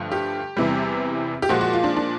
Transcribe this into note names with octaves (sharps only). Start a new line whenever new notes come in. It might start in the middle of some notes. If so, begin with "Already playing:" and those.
Already playing: G2 D3 F3 A3
G4
E2 C3 E3 G3
G4
A#2 F3 G#3 F#4
F#4
F4
D4
D4